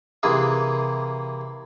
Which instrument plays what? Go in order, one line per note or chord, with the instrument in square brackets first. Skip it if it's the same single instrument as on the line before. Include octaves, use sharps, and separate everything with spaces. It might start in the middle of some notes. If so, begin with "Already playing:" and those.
[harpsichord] C3 E3 A#3 G#4